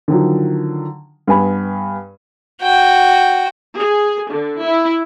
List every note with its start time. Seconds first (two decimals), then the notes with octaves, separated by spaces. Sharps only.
0.08 D3 D#3 F3 F#3
1.27 G2 B3 G#5 B5
2.62 F#4 G5
3.77 G#4
4.30 D3
4.63 E4